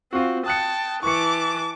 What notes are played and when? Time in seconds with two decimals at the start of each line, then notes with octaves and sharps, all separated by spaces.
0.13 C4 F4 F#4
0.46 G5 A5 D#6 F#6 C#7
1.03 E3 A5 C#6 D6 C#7